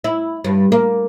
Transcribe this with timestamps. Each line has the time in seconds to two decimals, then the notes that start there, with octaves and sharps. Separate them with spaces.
0.04 E4
0.44 G2
0.72 A#3